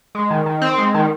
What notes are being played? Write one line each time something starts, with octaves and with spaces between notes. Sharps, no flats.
G#3
D#3
D#3
C4
G#3
D#3